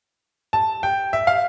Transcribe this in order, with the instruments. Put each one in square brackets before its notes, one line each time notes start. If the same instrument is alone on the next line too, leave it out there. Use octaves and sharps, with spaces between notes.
[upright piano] A5
G5
E5
F5